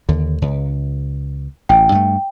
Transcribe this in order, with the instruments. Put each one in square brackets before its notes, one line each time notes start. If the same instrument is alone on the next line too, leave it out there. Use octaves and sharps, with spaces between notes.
[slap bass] D#2 D3
C#2
[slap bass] A1 [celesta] G5
[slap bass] G2 A3